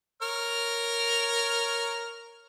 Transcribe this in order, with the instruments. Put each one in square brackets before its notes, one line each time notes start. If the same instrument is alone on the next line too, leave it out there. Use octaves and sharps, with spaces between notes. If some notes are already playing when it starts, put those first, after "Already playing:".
[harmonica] A#4 C#5 F6